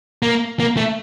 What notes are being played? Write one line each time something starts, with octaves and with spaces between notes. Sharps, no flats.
A#3
A#3
A3